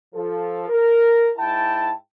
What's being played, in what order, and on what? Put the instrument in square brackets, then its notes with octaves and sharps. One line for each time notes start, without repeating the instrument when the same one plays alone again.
[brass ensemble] F3 A4
A#4
G#2 E4 G5 A5